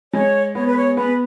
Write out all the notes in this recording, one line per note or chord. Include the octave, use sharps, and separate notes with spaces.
G#3 C#5
B3 C#5
B4
C#5
B3 B4